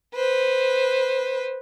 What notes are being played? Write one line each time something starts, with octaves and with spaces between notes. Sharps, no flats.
B4 C5